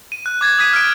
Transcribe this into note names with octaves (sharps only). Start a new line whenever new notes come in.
D#7
F#6
D6 G#6 A6
D#6 G#6 B6 D#7
F6 D7